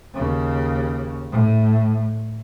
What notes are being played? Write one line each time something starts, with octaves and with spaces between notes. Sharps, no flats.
D#2 C#3
A2